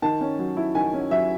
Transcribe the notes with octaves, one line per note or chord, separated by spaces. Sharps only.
D#3 A5
C#4
F#3
E4
D#3 G#5
C#4
F#3 E5